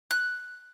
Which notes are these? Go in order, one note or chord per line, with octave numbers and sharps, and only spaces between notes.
F#6